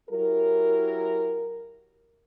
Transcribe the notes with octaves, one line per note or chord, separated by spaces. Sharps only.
F#3 E4 G4 A#4